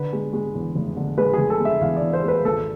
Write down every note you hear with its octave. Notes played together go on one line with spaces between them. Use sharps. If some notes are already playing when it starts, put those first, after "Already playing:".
Already playing: D3 B4
G#3
G#3
E2
F1
D3
G#3 B4
F1 G#4
A4
G#3
E5
E2 F5
D5
E2
C5
G#3 B4
G#1 A4